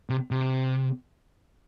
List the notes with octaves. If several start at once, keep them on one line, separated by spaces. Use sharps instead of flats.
C3
C3